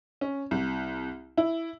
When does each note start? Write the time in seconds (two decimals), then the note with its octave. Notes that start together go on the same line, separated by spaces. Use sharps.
0.21 C#4
0.51 C2
1.38 E4